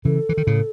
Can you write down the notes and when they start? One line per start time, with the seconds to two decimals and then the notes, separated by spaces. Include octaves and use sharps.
0.05 C#3 E3 A4
0.29 E3
0.37 D#3
0.47 A2 C#3